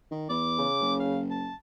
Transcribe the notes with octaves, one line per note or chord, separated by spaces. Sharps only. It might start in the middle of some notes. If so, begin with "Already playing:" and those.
D#3
E2 D6
C#3
F#1
F5
A5